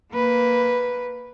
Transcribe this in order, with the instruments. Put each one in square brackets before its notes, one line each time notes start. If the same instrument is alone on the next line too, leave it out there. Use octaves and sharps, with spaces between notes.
[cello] A#3 B4